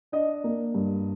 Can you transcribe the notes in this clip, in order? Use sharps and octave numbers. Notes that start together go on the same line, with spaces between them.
D4 D#5
A#3
G2